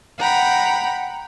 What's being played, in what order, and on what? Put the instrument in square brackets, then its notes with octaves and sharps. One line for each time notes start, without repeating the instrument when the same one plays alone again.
[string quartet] F#5 G5 A#5 B5